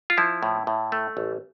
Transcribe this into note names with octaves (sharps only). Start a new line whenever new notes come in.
F4
F3 E4
A2
A2
A3
A1